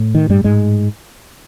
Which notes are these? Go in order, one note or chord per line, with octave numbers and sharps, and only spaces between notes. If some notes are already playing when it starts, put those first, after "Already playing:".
Already playing: A2
D#3
G2 G3
G#2 G#3